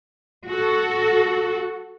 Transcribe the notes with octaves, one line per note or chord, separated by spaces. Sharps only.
F#4 A4